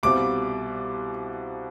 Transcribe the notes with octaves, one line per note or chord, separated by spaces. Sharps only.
C2 B2 G3 C4 F4 D6